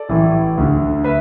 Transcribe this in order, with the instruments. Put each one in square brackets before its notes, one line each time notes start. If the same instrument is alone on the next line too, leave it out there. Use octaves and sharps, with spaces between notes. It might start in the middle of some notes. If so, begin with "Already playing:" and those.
Already playing: [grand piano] A4 D5
A1 A2 E3
D2 D3
B4 E5